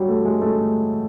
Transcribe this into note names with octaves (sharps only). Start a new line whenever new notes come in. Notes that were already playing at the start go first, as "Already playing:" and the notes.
Already playing: F#3 G3
A3
G#3
A3